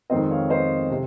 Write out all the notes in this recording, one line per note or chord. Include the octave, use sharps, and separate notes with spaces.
F2 D#3 G#3 C4 C5 D#5
C#5 F5
C5 D#5
C3